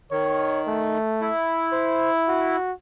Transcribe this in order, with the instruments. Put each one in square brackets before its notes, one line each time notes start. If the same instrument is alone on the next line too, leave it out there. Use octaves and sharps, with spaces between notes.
[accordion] D#3 [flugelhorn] C#5
[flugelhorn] A3
[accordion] E4
[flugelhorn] C5
F#4